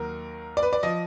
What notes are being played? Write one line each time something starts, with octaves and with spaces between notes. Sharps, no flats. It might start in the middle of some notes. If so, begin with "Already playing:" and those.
Already playing: D#2 D#3 F#3 A#4
D5
B4
D5
F3 D#5